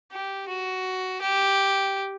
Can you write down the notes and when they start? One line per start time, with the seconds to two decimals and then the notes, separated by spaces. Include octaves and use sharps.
0.12 G4
0.48 F#4
1.22 G4